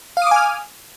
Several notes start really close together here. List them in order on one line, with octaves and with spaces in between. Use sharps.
F5 D#6 D6 G#5 F6